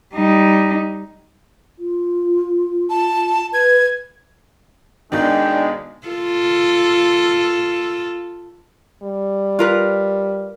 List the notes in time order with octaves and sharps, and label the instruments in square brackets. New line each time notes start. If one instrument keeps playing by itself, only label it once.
[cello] G3 D#4
[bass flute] F4
[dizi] A5
[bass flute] B4 [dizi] G#6
[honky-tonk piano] B1 B2 D#3 [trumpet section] G#3 [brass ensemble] D4 [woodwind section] D#4 G5
[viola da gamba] F4 A4
[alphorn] G3
[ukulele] F4 A#4 B4